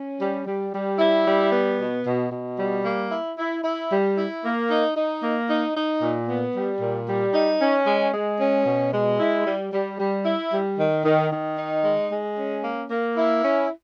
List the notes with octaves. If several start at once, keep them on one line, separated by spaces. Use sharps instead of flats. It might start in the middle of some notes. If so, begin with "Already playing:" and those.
Already playing: C#4
G3
G3
G3
E4
G3
B3
B2
B2
B2
G3
A#3
E4
E4
E4
G3
E4
A#3
D#4
D#4
A#3
D#4
D#4
A#2
B3
G3
A#2
G3
D#4
C#4
G#3
G#3
C#4
B2
G#3
E4
G3
G3
G3
E4
G3
D#3
D#3
D#3
D#4
G#3
G#3
C#4
A#3
A#3
E4
C#4